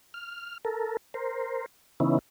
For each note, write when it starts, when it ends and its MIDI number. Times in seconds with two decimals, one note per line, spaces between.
0.14 0.58 89
0.65 0.97 69
0.65 0.97 70
1.14 1.66 70
1.14 1.66 72
2.00 2.19 49
2.00 2.19 52
2.00 2.19 59
2.00 2.19 61
2.00 2.19 63
2.00 2.19 64